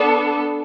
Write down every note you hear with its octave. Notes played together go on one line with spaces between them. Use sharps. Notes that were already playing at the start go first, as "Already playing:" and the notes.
Already playing: B3 D4 A4